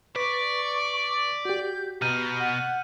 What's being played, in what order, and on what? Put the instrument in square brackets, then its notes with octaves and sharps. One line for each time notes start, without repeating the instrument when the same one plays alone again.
[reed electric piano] B4 [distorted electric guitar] D5 [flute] C#6 [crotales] B6
[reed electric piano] F#4 G4 [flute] G6
[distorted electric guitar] B2 [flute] A#5 [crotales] F6 G6 D#7
[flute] F#5